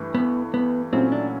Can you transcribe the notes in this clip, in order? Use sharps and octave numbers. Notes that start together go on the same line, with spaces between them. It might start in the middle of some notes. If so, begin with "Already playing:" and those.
Already playing: G2 E3 A3
B3
B3
A#2 F#3 A3 C4 C#4 E4
D4